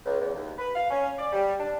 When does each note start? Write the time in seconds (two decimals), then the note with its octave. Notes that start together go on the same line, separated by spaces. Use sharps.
0.05 C#2
0.20 E2
0.35 D#2
0.58 B4
0.75 F5
0.91 C#4
1.18 D5
1.33 G3
1.60 D4